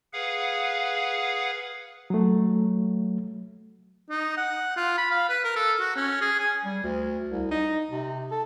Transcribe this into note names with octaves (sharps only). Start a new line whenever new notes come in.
G#4 B4 F5 F#5
F#3 A3
D#4
F#5
F4
B5
F5
B4
A#4
A4
F#4
C#4
G#4
G#5
G3
D2
C2
D#4
C3
A4